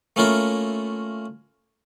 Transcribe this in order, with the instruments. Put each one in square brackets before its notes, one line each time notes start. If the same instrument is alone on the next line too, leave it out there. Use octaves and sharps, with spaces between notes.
[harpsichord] A3 A#3 C#4 E4 F4 A#4